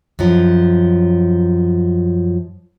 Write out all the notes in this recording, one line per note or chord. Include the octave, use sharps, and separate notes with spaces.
F#2 F3